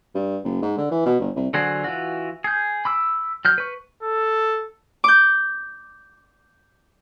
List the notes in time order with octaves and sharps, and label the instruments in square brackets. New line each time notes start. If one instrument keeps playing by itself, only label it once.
[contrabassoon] G2
F#1
G#2
D3
E3
B2
G1
C2
[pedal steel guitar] D3 F#3 F#4 G#4 C5
E3 F4 F#4
G#4 G6
B5 D6 E6
F#3 F6 G6
B4 C#6
[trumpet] A4
[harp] D6 G6